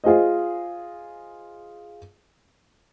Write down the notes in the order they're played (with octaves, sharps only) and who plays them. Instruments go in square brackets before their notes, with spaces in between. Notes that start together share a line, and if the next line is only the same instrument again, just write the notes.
[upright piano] F4 G#4 C5 D#5